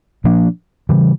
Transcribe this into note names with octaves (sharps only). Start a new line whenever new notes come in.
A#2 F3 A#3 D4
C#3 E3 G3